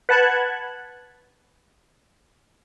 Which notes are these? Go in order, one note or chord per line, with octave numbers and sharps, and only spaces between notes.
B4 F#5 A5 B5 F#6 G#6